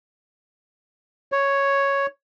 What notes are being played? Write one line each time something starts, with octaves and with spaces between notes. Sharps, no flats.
C#5